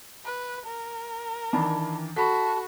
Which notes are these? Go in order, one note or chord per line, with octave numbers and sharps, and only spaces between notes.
B4
A#4
D#3 E3 D4 A5 B5
F#4 A4 A5 B5 C#6 B6